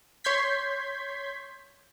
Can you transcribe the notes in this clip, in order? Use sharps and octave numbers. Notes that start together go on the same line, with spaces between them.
C#5 C6 G6 G#6 B6